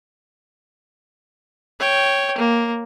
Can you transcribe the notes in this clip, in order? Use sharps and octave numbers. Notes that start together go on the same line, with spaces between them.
C#5 G5
A#3